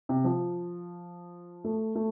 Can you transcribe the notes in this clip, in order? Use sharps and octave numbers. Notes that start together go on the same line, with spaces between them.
C3
F3
A3
A3